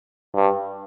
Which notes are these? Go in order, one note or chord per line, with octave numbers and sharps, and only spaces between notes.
G2